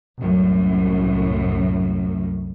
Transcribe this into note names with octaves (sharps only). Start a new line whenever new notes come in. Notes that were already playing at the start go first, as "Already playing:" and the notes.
C2 F#2 A2